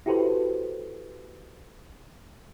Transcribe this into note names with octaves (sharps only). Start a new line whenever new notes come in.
E4 F#4 G4 A4 B4 C5